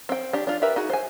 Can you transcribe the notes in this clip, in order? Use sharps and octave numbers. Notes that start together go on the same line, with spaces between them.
C4 G5
D4 G4
D4 F4
G4 A#4 B4 E5
D#4 F#4 G#4
C5 G#5